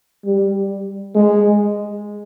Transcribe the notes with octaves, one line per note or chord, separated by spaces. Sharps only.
G3
G#3